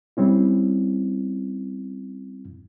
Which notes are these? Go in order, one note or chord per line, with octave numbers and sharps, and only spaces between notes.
G3 C4 C#4 E4